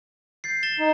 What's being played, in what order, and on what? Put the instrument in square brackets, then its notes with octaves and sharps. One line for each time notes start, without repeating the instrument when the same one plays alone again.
[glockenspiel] G6 A6 C7
A6 E7 G7
[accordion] D#4